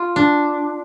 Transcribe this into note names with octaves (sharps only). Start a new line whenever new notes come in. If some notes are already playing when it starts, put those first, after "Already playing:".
Already playing: F4
D4